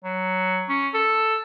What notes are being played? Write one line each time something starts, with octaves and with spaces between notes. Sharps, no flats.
F#3
C#4
A4